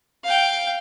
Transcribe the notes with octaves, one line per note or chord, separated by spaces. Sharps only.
F5 G5